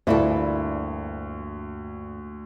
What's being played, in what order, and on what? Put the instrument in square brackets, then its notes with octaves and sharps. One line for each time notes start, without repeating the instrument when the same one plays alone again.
[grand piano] D2 [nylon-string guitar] G2 E4 A4 [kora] A#2 E3 D4